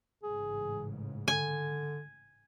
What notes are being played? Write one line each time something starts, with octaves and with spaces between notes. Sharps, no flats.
A1 G#2 C#3 G#4
D3 G#5